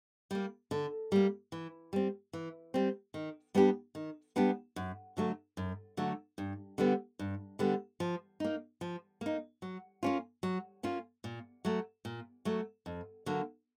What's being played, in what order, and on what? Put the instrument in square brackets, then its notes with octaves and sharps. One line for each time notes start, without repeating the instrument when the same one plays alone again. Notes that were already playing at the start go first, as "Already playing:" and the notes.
[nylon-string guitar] G3 A#3
D3
G3 A#3
E3
G3 C4
E3
G3 C4
D#3
G3 B3 D4 G4
D#3
G3 B3 D4 G4
F#2
D3 F#3 A3
F#2
D3 F#3 A3
G2
D3 G3 B3
G2
D3 G3 B3
F3
A#3 D#4
F3
A#3 D#4
F#3
A#3 C#4 F4
F#3
A#3 C#4 F4
A#2
F#3 A3
A#2
F#3 A3
F2
D3 F#3 A#3